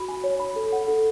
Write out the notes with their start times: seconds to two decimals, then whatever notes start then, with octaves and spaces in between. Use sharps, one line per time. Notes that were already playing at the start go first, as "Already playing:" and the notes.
Already playing: F#4 B5
0.08 G#5
0.24 C#5
0.40 B5
0.56 A4
0.72 F#5
0.87 A4